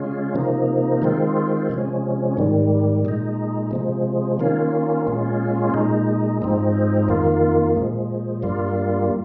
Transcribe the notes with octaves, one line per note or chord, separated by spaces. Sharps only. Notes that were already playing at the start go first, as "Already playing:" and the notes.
Already playing: C#3 G#3 C#4 F4
C3 F3 A#3 D#4
D#3 G#3 C4 F4
C3 F3 G#3 C#4
G#2 D#3 G3
A#2 G#3 D#4
C3 F3 G#3
D#3 A#3 C#4 F4
A#2 G#3 C#4 F4
A#2 G#3 D#4
G#2 F3 G#3 C4 D#4
F2 D#3 A#3 F4
A#2 F3 G#3
G2 G3 A#3 F4